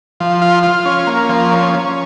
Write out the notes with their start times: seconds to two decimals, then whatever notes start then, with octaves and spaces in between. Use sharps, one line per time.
0.20 F3
0.42 F4
0.63 F4
0.85 C#4
1.07 A#3
1.29 F3
1.51 C#4
1.74 C#4